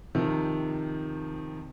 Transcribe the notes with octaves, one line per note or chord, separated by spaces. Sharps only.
C3 D#3 F3